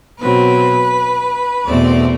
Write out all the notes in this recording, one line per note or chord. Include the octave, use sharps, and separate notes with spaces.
B2 F#3 C4 B4
E2 B2 A3 C4 D5